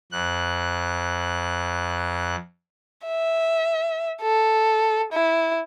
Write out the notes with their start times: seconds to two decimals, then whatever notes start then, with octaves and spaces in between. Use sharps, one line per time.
0.12 F2 F#6
3.06 E5
4.22 A4
5.13 E4